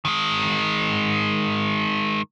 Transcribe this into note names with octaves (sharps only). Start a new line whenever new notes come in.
D#3 G#3